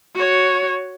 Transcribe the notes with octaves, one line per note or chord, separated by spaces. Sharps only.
F#4 C#5